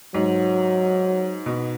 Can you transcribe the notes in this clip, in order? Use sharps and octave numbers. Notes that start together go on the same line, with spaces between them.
G#2 F#3
B2